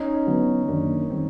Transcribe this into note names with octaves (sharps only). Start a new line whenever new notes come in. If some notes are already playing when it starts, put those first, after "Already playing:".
Already playing: C#4 D#4
D3 F#3 B3
F#2 D#3 F#3 A#3 D4
D#3 G3 C4